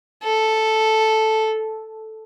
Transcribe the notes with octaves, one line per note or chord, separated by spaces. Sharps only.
A4